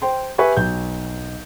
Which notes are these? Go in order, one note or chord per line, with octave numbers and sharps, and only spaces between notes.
C5 G5 C6
G4 B4 E5 G#5 C#6
B1 G6